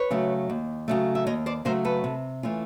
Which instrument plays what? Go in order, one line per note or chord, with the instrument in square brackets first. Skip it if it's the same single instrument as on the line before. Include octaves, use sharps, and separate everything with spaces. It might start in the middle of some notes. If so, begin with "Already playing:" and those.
Already playing: [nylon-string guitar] B4 C#5
C#3 F#3 A3
D#2
C#3 F#3 A3
E5
D#2 C#5 D#5
C5 D5
C#3 F#3 A3 A#4 C5
A4 B4
C3
E3 A3 C#4 F4